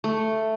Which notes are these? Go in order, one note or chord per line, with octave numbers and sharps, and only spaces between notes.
A3